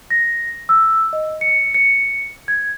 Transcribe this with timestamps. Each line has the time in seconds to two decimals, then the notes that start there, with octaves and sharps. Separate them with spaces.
0.10 A#6
0.69 E6
1.13 D#5
1.41 C#7
1.74 C#7
2.48 G#6